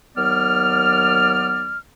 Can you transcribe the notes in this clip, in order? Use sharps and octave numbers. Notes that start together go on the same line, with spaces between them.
D#2 F#3 B3 D5 F6